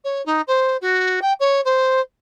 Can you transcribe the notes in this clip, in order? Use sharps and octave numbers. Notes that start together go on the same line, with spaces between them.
C#5
D#4
C5
F#4
G5
C#5
C5